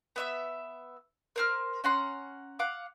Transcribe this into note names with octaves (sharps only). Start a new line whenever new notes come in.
B3 E5 E6
A#4 C5 F6
C#4 F#5 A#5 C6
F5 F#5 D6